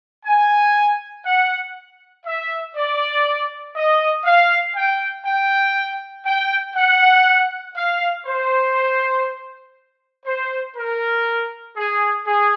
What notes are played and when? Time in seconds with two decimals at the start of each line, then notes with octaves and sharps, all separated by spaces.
0.25 G#5
1.26 F#5
2.26 E5
2.76 D5
3.76 D#5
4.25 F5
4.75 G5
5.26 G5
6.26 G5
6.76 F#5
7.75 F5
8.26 C5
10.26 C5
10.76 A#4
11.77 G#4
12.26 G#4